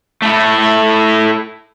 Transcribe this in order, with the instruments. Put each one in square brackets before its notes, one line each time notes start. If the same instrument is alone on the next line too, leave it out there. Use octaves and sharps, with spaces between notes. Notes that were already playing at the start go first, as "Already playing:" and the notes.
[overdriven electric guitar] A3 E4